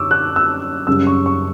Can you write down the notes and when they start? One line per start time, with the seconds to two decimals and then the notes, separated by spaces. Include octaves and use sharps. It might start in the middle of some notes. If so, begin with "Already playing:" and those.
Already playing: F#2 D3 F#3 C#6 D6 E6
0.11 F#6
0.36 E6
0.87 F#2 C#3 G3 E6
1.07 C#6
1.26 C#6